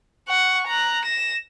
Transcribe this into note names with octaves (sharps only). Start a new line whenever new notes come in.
F#5 C#6
A#5 F#6
A#6 E7